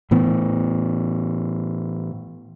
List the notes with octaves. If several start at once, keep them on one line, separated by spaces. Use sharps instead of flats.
A2 E3 B3